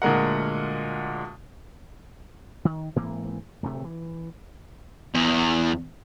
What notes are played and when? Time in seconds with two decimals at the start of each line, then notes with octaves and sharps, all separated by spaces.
0.02 D2 A#2 G#3 A#4 F#5
2.65 D#3
2.96 G#2 E3 A#3 C4
3.63 D1 D2 C3 A3
3.84 E3
5.15 E2